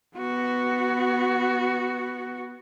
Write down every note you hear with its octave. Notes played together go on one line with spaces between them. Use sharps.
B3 F#4